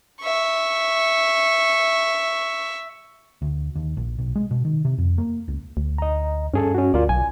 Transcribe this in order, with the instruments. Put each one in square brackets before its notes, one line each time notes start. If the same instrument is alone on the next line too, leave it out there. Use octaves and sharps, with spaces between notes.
[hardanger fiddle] E5 C#6
[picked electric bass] D2
D#2
A#1
B1
G#3
B2
D#3
C3
F2
A#3
C#2
[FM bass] D2
[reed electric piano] D#5 A#5
[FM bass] G2 [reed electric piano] C#4 G#4 A4
[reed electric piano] C#4 F#4
[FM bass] D2 [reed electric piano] F4 A#4 D5
[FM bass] B1 [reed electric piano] G#5